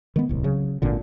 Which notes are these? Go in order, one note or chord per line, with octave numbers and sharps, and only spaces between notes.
D#3 G#3 B3
D1 C2
C#3 F#3
G#1 A#2 D3